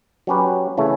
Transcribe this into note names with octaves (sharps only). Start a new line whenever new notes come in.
F#3 C#4 G4 B4
C#3 E3 A3